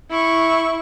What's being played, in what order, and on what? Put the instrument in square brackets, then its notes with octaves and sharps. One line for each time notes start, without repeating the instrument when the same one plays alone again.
[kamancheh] E4 C#6